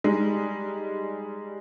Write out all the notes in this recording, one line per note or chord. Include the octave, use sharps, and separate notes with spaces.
G3 G#3 D#4